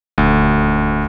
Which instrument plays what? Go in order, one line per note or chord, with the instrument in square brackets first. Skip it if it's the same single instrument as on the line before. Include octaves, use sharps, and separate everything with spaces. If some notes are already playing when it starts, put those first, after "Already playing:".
[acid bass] D#1 [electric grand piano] D2